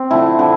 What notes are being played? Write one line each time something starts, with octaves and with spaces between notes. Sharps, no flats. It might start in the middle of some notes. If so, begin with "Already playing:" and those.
Already playing: C4
D3 F3 A3 E4
D3 F3